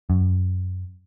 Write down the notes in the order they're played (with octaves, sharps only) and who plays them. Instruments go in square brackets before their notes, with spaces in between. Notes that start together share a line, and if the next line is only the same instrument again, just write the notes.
[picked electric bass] F#2